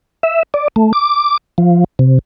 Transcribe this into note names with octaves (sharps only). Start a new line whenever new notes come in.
E5
D5
A3
D6
F3
C3